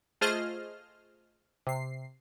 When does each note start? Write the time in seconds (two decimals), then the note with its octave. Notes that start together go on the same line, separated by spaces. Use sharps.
0.21 A3 F4 G#4 C5 D#5 F6
1.67 C3 C7